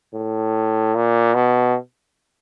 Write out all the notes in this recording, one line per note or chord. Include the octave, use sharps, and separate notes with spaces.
A2
A#2
B2